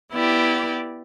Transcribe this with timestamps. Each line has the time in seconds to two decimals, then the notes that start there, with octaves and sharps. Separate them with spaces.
0.13 B3 E4 G4 D5